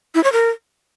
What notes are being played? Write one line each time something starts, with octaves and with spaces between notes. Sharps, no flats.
E4
C#5
A#4